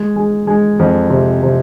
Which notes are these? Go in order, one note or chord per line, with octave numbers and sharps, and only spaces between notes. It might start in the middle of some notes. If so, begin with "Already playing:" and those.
Already playing: G#3
G#3
G#3
F2
C3
C3